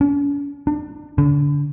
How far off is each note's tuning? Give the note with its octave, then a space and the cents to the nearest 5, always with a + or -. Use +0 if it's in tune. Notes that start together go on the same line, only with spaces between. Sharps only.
C#4 +45
D4 +30
D3 -30